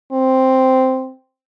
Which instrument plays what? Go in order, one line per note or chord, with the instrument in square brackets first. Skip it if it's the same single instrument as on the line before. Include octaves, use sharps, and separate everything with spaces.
[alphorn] C4